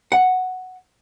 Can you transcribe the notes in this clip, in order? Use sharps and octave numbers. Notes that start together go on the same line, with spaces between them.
F#5